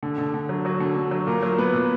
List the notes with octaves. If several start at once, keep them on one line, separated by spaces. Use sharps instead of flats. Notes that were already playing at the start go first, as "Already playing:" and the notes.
D3
D3
D3
F#3
F#3 F#4
D3
D3
F#3
A#2 A#3 A#4
F#3
A#2 B3 B4
A#2